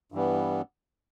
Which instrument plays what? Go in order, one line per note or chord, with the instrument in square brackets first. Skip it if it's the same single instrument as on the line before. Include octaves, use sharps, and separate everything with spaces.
[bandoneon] G2 E3 G3 B3